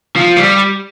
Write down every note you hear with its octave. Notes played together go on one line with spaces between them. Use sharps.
F3
G3